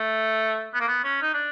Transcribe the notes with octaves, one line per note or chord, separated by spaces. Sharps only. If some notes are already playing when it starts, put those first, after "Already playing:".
Already playing: A3
B3
A#3
B3
C#4
D#4
D4